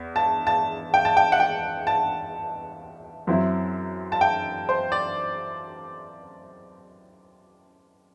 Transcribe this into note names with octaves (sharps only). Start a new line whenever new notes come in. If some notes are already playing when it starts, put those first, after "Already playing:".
Already playing: E2
A5
A5
G5
A5
G5
F#5
G5
A5
F#2 F#3 C4 E4
A5
G5
C5
D5